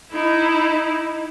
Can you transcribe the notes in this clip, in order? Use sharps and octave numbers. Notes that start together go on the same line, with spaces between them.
D#4 E4